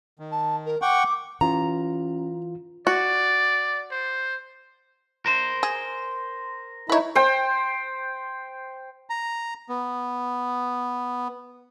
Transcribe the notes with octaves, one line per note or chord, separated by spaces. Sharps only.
D#3
A5
A#4
F#5 G5 C#6 D6
E3 C#4 F4 G4 A#5
F#4 D5
C5
A#4 C5
G#4
D#4 E4 B4 C#5
C5 G5
A#5
B3